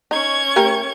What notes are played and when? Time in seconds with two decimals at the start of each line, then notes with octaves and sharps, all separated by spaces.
0.11 C#4 D#4 C#6 G#6
0.56 A3 G4 A#4